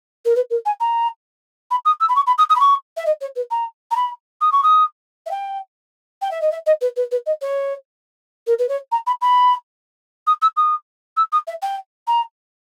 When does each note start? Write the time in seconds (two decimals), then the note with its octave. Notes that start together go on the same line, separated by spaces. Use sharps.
0.25 A#4
0.36 B4
0.50 A#4
0.66 G#5
0.80 A#5
1.71 B5
1.85 D#6
2.00 E6
2.09 B5
2.16 C#6
2.27 B5
2.38 D#6
2.50 D#6
2.56 B5
2.60 C#6
2.97 E5
3.06 D#5
3.21 C#5
3.36 B4
3.51 A#5
3.91 A#5
3.96 B5
4.41 D#6
4.52 C#6
4.63 D#6
5.26 E5
5.31 G5
6.22 G5
6.31 E5
6.42 D#5
6.51 E5
6.66 D#5
6.81 B4
6.96 B4
7.11 B4
7.26 D#5
7.41 C#5
8.47 A#4
8.59 B4
8.69 C#5
8.92 A#5
9.07 B5
9.21 B5
10.27 D#6
10.42 E6
10.57 D#6
11.17 E6
11.32 D#6
11.47 E5
11.62 G5
12.07 A#5